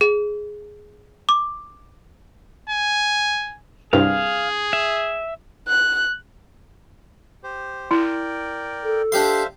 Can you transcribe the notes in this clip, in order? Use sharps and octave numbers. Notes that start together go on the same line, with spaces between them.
G#4
D6
G#5
C2 G2 G#4 F5
E5
F#6
G4 C5
E4 A#4 D5 G5
A4
D4 G4 C5 E5 F5 C6